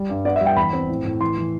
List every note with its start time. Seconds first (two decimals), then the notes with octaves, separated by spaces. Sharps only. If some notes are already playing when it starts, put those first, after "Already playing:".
Already playing: G3
0.09 G2
0.25 B3 D5
0.36 E5
0.41 G3
0.46 G5
0.57 E2 B5
0.73 C4
0.89 A2
1.05 A2
1.21 E3 C6
1.38 E3